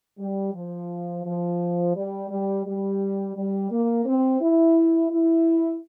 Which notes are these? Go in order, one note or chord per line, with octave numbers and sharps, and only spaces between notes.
G3
F3
F3
G3
G3
G3
G3
A#3
C4
E4
E4